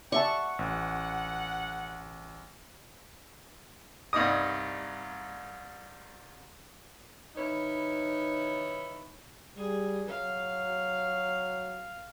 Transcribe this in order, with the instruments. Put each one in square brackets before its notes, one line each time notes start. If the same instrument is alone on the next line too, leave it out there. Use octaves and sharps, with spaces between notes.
[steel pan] D5 E5 A5 [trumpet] F#5 [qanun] C#6
[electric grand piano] A1
[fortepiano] C2 G2 D#4 D#5 D#6
[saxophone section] D#3 D#4 E4 B4 C#5
[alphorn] G3 [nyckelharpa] G#4
[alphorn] F#3 [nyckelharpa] F5